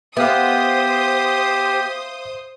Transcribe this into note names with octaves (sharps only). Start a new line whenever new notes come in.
B3 G4 C5 E5 F5 D#6